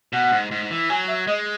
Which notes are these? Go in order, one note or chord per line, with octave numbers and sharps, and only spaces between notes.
B2 F#5
G#2
G#2
E3
F#3 G#5
E5
G#3 D#5